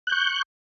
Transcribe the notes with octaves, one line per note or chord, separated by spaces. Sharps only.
C#6 F#6 G6